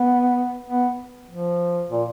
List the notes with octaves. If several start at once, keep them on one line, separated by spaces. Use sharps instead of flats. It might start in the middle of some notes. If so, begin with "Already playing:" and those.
Already playing: B3
B3
F3
A#2